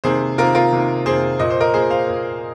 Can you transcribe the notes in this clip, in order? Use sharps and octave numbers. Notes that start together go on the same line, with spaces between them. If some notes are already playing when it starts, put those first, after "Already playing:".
C3 D#3 A#3 G#4 C5
C3 D#3 A#3 F4 A#4
F4 A#4
C3 D#3 A#3
C3 D#3 A#3 G#4 C5
A#2 A#3 D#5
C5
A#4 D#5
A#2 A#3 G#4 C5
C5 F5
A#2 A#3